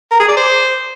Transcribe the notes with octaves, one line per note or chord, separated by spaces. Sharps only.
A#4
G#4
D5
C5